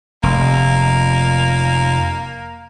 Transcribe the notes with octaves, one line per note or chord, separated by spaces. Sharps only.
F1 A#3